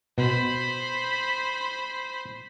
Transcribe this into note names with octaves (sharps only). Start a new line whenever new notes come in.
B2 C5 B5